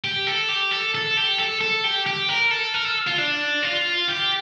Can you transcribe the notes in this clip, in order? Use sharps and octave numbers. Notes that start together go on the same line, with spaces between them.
G4
A4
G4
A4
A4
G4
A4
A4
G4
G4
A#4
A4
A#4
A4
F4
D4
F4
G4